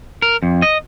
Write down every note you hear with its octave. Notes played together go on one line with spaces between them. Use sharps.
A#4
F2
D#5